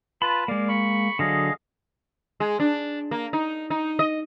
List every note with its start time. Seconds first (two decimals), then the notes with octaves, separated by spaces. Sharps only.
0.22 F4 B4 A5 B5
0.48 G#3 A#3 D5 F5
0.68 B5 C#6
1.19 D3 F#3 G#4 D#5 F5
2.40 G#3
2.60 D4
3.11 A#3
3.33 D#4
3.70 D#4
3.99 D#5